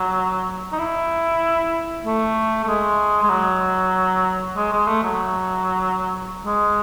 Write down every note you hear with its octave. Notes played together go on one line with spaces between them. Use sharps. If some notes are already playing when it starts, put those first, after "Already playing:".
Already playing: F#3
D#4
E4
A3
A3
G#3
G#3
F#3
G#3
G#3
A3
F#3
G#3